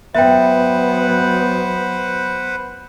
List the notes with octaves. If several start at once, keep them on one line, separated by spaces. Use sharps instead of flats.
F#3 B3 B4 C5 E5 F#5 G5